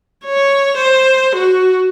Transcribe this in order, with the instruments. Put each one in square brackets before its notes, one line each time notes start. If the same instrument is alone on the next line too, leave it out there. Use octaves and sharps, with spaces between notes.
[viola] C#5
C5
F#4